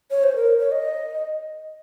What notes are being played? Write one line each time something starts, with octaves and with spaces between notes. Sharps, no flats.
C#5
C5
A#4
C#5
D#5